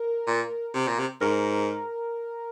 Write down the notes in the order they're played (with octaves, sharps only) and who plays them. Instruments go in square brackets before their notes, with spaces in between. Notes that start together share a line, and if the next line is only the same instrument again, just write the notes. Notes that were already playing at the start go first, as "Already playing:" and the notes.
Already playing: [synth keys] A#4
[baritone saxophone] A#2
C3
A#2
C3
[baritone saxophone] G#2 [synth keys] A#4